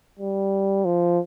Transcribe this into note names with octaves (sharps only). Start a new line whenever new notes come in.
G3
F3